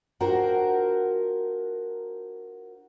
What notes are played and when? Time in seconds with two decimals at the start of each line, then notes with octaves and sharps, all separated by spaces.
0.20 D4 F4 F#4 A#4 C5 G5